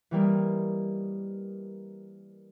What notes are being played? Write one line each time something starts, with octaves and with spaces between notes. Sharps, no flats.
E3 G3 A#3 D#5